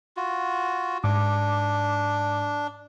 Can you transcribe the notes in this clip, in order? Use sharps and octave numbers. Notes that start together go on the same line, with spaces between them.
F4 F#4
G#2 D4 D6